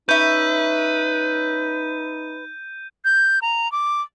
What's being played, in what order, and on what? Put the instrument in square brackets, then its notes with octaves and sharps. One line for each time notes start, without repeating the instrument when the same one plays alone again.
[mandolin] C#4 E5 [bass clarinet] D#4 [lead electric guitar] B4 [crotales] G6 D#7
[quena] G6
A#5
D6